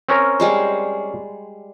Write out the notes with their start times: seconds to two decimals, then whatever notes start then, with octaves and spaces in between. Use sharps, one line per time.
0.09 C4 C#4 A#4
0.40 G3 G#3 C5